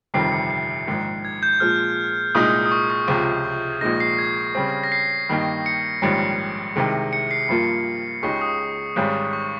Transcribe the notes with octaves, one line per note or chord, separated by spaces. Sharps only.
G1 F2 C3 D#3 G3 C7
C#7
C7
A#1 G#2 D#3 C7
G#6
G6
A#2 F3 G#3 F6
C2 A#2 G#3 D#4 D#6
D#6
C#6
C#6
C#2 C3 F3 G#3 D#6
D#6
C#6
G#6
A#1 A#2 G#3 D#4 A#6
C7
G#6
C#3 G3 C4
A#6
C7
G2 D#3 A#3 D#4 G4
C#7
A#1 G#2 D#3 G3 C#4
C7
C2 C3 D#3 G#3
C#7
C7
G2 F3 A#3 F4
C#2 C#3 G#3 D#4 G4 C#6
D#6
G#1 G#2 G3 C#4 G#4
C#6